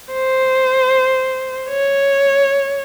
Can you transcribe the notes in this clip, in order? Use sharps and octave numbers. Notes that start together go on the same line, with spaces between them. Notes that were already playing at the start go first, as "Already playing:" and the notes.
C5
C#5